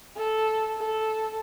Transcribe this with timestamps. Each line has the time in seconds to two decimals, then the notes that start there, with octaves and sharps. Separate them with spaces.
0.16 A4
0.78 A4